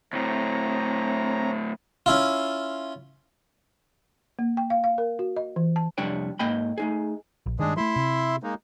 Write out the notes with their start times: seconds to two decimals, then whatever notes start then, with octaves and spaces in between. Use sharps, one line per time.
0.13 D2 A2 C4 C#5 A#5
2.06 C#4 E4 F4
4.39 A#3
4.57 G5
4.70 F5
4.84 F5
4.98 A#4
5.19 F#4
5.37 D#5
5.56 E3
5.76 A5
5.98 C2 F2 G3 D4 C#5 G5
6.39 G#2 A#3 D#5 G5 B5
6.78 A3 D#4 G#4
7.46 A#1
7.60 G2 D#3 G#3 D4 G#4
7.77 F#3 A3 E4 E5 C6
7.96 C3
8.43 G#3 A#3 D#4